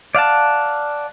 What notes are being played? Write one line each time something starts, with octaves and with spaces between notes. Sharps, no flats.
D5 F5 F#5 A5